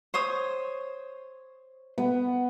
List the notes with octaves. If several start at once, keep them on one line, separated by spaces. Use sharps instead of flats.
C5 C#5 D#6
B3